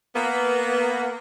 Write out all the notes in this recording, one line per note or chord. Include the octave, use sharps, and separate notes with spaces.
A#3 B3